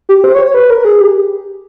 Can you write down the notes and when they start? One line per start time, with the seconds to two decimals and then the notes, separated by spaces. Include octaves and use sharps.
0.09 G4
0.24 C5
0.35 C#5
0.45 C#5
0.54 B4
0.70 A#4
0.85 G#4
1.01 G4